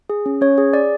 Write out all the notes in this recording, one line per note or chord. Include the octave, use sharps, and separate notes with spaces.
G#4
C#4
C#4 C#5
G#4
G#4 D5